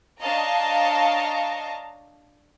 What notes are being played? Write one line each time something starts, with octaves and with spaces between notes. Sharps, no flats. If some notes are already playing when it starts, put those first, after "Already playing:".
D4 C#5 D#5 F5 A5 A#5